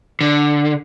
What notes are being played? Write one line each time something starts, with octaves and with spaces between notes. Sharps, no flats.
D3